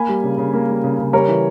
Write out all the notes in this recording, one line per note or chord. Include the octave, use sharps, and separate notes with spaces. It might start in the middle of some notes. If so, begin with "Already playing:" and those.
Already playing: A#3 G#5 B5
G3
C#3
C#3
A#3
G3
C#3
C#3
G3 A#4 C#5
E3